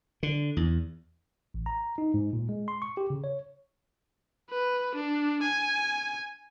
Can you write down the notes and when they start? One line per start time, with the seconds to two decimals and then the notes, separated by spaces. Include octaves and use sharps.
0.23 D3
0.57 E2
1.54 A1
1.66 A#5
1.98 D#4
2.14 G#2
2.33 A#2
2.49 G#3
2.68 C6
2.82 C#6
2.97 G4
3.10 C#3
3.24 C#5
4.50 B4
4.95 D4
5.43 G#5